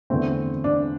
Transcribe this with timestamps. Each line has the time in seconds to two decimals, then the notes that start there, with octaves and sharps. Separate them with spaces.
0.10 E2 D3 A3 C4
0.64 D4